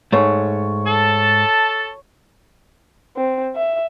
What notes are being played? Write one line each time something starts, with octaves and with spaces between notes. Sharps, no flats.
G#2 A3 C#5
A4 A5
C4
E5